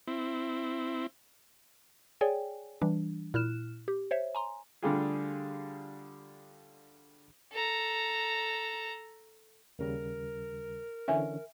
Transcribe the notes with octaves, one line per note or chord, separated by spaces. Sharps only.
C4 E4
G#4 C#5 D5 G5 G#5
E3 G3 D4
A#2 E4 F6 F#6 E7
G4
C5 C#5 E5
G#5 A#5 C6
D3 G3 A3 F4 G4 G#4
A4 A#5
D#2 C#3 G3 A#4
D3 E3 C#4 E5 G#5